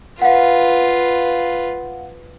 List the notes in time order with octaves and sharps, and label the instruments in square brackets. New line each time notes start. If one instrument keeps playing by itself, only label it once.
[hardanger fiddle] F4 B4 [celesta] F5 F#5